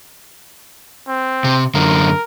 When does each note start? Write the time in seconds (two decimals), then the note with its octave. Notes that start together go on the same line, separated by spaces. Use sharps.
1.08 C4
1.44 C3
1.75 F#2 D3 A#4